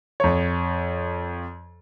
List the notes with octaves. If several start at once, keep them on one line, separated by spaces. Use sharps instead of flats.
F2 C#5